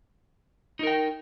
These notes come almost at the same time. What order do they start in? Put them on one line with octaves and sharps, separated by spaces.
D#4 A#4 G5